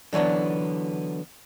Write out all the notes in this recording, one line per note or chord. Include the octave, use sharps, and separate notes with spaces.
D3 E3 F#3 B3 D4